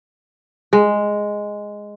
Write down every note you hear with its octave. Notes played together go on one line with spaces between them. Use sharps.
G#3